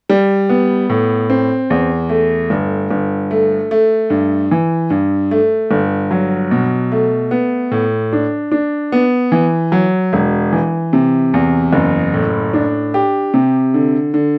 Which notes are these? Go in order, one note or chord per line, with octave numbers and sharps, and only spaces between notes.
G3
B3
A2
C4
E2
A3
G1
G1
A3
A3
G2
E3
G2
A3
G1
F#3
B2
A3
B3
A2
D4
D4
B3
E3
F#3
E1
E3
C3
E2
F#1
A2
D4
G4
C3
D3
D3